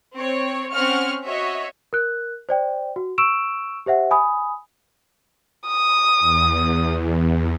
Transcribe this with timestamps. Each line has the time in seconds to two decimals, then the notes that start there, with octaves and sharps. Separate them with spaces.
0.17 C4 C#5
0.73 C4 C#4 F#5 C#6 F6
1.26 F#4 C#5 D#5 E5
1.93 A#4 F#6
2.49 C5 D5 G5
2.96 F#4
3.18 C#6 E6 D7 E7
3.86 G4 C5 E5 F#5
4.11 G#5 B5 D#6
5.67 D#6
6.20 E2